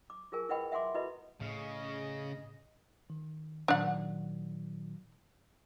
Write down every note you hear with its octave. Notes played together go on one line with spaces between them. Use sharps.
D6
F4 G#4 A#4 G#5
E4 B4 D#5 F#5 G5 B5
E5 F#5 G#5 C6 D6
E4 F#4 A4 B4 D#5 B5
A2 C#3 D#5
D#3
A#2 D#3 F#3 D4 F#5